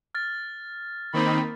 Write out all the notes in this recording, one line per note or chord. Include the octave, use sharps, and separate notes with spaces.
F6 A6
D#3 A#3 C4 D#4 B5